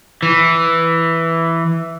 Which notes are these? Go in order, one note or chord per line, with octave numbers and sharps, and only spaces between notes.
E3